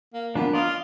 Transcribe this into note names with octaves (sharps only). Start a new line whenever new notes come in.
A#3
F3 A#3 B3 D4
F4 D5 D#5 F5